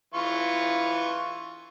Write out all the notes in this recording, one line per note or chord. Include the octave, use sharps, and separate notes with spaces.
E3 F4 C#6